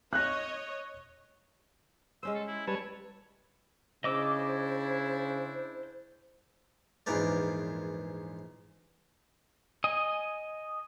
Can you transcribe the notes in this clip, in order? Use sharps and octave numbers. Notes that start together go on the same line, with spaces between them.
C#5 D#5 F#6 A#6
G#3 C#4 C5 E6
A4
E4
G3 B4 C#5 A5
C#3 D4 E4 C5 D#5 D6 E6
A#1 E2 G#2 B3 A#4 D5
D#5 G#5 D#6